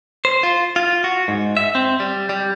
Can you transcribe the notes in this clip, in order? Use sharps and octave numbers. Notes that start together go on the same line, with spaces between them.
C5
F4
F4
F#4
G#2
E5
C4
G3
G3